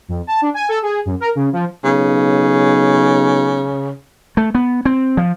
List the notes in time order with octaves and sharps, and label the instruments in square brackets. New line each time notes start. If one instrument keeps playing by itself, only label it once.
[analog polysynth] F2
A5
D4
G#5
A4
G#4
F#2
A#4
C#3
F3
[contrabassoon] B1 [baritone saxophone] C#3
[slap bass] A3
B3
C4
F3